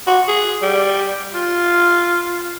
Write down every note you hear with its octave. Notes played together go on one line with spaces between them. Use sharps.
F#4
G#4
G3
F4